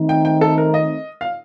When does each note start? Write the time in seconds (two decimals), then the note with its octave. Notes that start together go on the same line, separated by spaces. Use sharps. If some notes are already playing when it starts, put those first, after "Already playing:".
Already playing: D#3 A3 C4 D#4
0.09 G5
0.25 G5
0.41 A4
0.58 A#4
0.74 D#5
1.21 F5